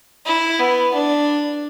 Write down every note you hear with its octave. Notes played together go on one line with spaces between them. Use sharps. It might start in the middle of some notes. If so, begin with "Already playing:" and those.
E4
B3
D4